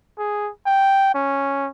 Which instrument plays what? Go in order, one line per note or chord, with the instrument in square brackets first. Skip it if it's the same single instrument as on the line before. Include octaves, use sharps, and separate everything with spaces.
[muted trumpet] G#4
G5
C#4